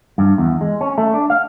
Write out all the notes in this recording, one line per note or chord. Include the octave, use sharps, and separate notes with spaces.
G2
E2
G#3
C#4
A3
D4
F5